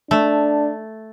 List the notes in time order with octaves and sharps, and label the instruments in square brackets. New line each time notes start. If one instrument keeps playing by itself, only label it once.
[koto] A3 [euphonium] D4